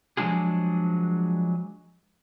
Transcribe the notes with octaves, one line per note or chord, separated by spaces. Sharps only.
F3 F#3 G#3 D4 F4 G#4